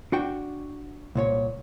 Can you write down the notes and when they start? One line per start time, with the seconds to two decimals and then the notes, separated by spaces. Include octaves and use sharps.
0.12 D4 F#4 G5
1.15 C2 A#2 C#5